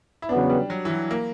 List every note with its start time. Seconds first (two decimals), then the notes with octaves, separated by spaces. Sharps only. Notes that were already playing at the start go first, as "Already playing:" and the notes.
0.22 E4
0.29 E2 C#3 F#3 B3 D4
0.50 G3
0.70 F#3
0.85 E3
0.90 F#3
1.11 A#3